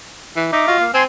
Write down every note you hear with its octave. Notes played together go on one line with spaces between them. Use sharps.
E3
D#4 E5 A#5 D6
F4 F#4 D#5
A#3 F5
C4 G#5 C6